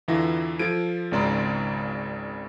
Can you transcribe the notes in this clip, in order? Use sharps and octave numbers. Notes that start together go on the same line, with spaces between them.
E2 D3 E3 E4 F4 A#6
F3 F4 A4 G#6 D7 D#7
G#1 C#2 C#3 D5 A#5 C6